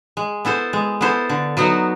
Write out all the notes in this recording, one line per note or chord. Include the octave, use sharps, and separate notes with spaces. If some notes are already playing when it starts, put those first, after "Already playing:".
G#3
B3 E4 A4 C5
G#3
B3 E4 A4 C5
D3
F#3 B3 D#4 F#4